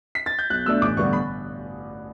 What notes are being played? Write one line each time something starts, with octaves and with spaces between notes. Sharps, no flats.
B6
A6
G6
B1 F#6
B2 A3 D4 E6
A1 D6
G2 D3 G3 B3 C#6
B5